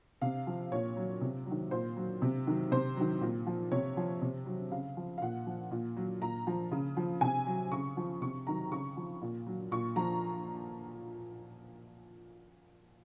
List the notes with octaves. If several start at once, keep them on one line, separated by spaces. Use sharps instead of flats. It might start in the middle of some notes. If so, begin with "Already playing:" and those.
C3 F5
F3
A#2 C#5
F#3
C3
D#3 F#3
A#2 C5
F#3
C3
D#3 F#3
C3 C5
D#3 F#3
A#2
F3
C3 C#5
F3
C3
F#3
C#3 F5
F3
F5
A#2 F#5
F3
A#2
F#3
A#2 A#5
F3
C#3
F3
C3 G#5
F#3
C#3 C#6
F3
C3 C#6
D#3 F#3 A#5
C#3 C#6
F3
A#2
F#3
A#2 C#6
F3 A#5